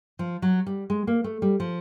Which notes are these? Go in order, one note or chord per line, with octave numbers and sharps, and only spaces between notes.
F3
F#3
G3
G#3
A#3
A3
G3
F3